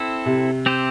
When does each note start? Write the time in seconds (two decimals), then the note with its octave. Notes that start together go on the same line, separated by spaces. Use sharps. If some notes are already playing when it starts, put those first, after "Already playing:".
Already playing: C4 E4 A4
0.26 C3
0.66 C4 G4 C5